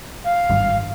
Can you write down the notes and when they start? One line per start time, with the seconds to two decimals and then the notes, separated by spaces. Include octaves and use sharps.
0.24 F5
0.50 G#1 G2